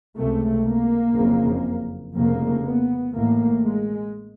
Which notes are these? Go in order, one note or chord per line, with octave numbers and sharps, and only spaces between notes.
C#2 C3 A3
A#3
F#1 F2 C#3
F1 F2 C#3 A#3
B3
A1 A2 A#3
G#3